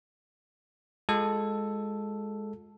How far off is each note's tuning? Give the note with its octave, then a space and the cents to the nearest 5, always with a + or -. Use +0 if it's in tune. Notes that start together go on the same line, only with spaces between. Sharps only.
G#3 +0 F4 +40 A4 +0